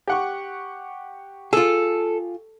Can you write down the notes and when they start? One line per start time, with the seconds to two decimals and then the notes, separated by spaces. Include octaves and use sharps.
0.08 G4 F#5 C#6
1.53 F4 G#4 A4